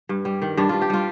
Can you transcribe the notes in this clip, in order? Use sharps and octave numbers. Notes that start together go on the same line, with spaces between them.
G2
G3
D#3
G2 D4
G2 F4
G4
G3 F4